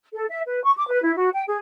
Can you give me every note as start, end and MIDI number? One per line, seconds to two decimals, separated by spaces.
0.13 0.25 69
0.29 0.40 76
0.47 0.62 71
0.62 0.72 85
0.76 0.86 86
0.89 1.01 71
1.02 1.13 64
1.17 1.28 66
1.34 1.43 79
1.48 1.58 68